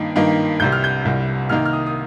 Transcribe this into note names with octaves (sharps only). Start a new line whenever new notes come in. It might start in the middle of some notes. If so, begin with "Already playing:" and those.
Already playing: G2 D#3 A#3 D#4
G2 D#3 A#3 D#4
C2 C3 G3 G6
F6
G6
C2 C3 G3
C3 D#3 A#3 D#4 F6
F6
D#6
D#6